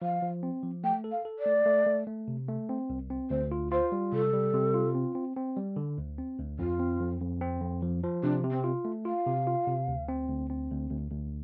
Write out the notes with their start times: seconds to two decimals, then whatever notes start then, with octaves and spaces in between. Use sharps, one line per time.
0.02 F3 F5
0.22 F3
0.43 C4
0.63 F3
0.84 A3 G5
1.04 A4
1.12 F5
1.25 A4
1.39 D5
1.46 A3
1.66 A3
1.86 A3
2.07 A3
2.28 C3
2.48 A3
2.69 C4
2.90 C2
3.10 C4
3.30 D2 C5
3.52 F4
3.72 F4 C5
3.92 G3
4.12 C3 A4
4.33 G3
4.54 C3
4.74 F4
4.95 C4
5.15 C4
5.36 C4
5.57 G3
5.76 D3
5.98 D2
6.18 C4
6.39 D2
6.59 F2 F4
6.80 C4
7.00 F2
7.20 F2
7.41 C4
7.61 F2
7.82 F3
8.03 F3
8.23 C3 D4
8.44 C3
8.50 C4
8.64 F4
8.85 A3
9.05 F4 F5
9.26 C3
9.47 F4
9.67 C3
9.88 D2
10.08 C4
10.29 D2
10.50 C4
10.70 D2
10.90 D2
11.11 D2